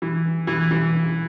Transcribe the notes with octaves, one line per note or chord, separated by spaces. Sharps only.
E3
E3
E3